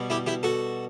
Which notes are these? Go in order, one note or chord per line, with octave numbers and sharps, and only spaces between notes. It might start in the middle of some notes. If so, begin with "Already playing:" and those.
Already playing: B2 G3
E4 G4
E4 G4
F#4 A4